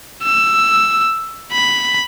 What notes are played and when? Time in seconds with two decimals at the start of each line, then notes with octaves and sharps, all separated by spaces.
0.23 E6
1.52 B5